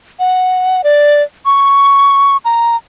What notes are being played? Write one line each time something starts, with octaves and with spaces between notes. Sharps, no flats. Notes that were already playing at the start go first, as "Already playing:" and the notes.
F#5
D5
C#6
A#5